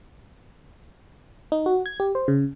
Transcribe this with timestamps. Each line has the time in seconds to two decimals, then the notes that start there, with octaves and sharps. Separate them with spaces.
1.52 D#4
1.66 F#4
1.86 G#6
2.00 G4
2.15 C5
2.28 C#3